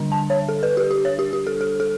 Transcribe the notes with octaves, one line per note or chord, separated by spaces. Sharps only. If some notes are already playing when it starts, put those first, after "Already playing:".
Already playing: D3 G3 D4
A5
C#5
A4
B4
G4
G4
C#5
G4
G4
A4
A4
A4